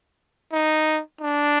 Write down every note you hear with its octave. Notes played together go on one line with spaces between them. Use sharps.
D#4
D4